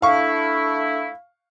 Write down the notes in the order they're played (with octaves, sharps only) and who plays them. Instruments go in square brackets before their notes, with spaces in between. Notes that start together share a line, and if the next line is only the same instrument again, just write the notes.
[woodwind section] A3 D4 E4 [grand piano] F5 C#6